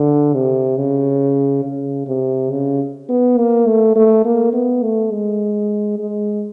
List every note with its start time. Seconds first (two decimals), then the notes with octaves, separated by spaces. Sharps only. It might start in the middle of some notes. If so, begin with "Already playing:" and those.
Already playing: D3
0.34 C3
0.77 C#3
1.64 C#3
2.07 C3
2.51 C#3
3.09 B3
3.38 A#3
3.66 A3
3.96 A3
4.25 A#3
4.53 B3
4.83 A3
5.12 G#3
5.99 G#3